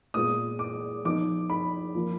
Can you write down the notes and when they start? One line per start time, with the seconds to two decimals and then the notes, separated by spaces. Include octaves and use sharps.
0.14 A#2 G#3 B3 F4 D#6
0.59 D6
1.05 F3 B3 D#4 D6
1.50 B5
1.95 F3 A#3 F4